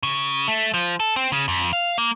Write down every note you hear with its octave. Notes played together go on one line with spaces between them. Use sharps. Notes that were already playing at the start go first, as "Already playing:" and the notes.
C#3
A3
F3
A4
C4
C#3
F2
F5
A#3